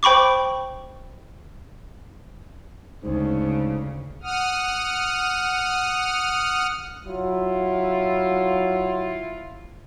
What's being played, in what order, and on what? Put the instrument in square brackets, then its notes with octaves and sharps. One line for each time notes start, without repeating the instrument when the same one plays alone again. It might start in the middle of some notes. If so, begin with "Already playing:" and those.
[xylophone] C5 G5 B5 C#6 D6
[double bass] D2 [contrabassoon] G#2 [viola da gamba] C#3
[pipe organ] F#5 D#6 F6
[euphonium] F#3 [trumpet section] E4 F4